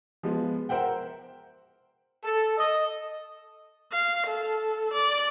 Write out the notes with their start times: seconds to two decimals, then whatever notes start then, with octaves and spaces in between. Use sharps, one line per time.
0.23 F3 G#3 B3
0.69 A#4 C5 E5 F#5 G5
2.24 A4
2.58 D#5
3.92 F5
4.27 A4
4.93 D5